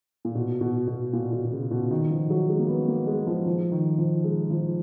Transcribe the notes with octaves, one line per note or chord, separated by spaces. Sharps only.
A#2
B2
B2
B2
A#2
B2
B2
C#3
B2
D#3
F3
F#3
G#3
A#3
B3
A#3
G#3
F3
F3
D#3
F3
G#3
F3